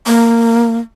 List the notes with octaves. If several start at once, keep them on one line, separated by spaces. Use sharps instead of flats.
A#3